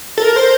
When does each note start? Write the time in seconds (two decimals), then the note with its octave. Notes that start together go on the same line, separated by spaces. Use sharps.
0.18 A4
0.22 A#4
0.36 C5